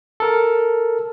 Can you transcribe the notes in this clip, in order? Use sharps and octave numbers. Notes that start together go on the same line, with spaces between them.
A4 A#4